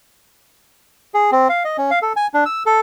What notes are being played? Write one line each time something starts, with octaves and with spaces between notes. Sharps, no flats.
G#4
C4
F5
D#5
C#4
F5
A4
G#5
D4
E6
A4